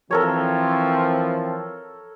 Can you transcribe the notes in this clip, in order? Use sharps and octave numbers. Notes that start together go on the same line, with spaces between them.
E3 F3 C4 A4 A#4 C#5